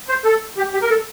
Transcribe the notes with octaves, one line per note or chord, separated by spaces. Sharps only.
C5
A4
G4
G4
A#4
A4